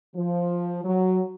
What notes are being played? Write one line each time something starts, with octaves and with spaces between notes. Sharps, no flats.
F3
F#3